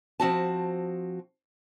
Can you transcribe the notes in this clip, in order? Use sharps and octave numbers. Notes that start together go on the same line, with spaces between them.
F3 C4 F#4 A5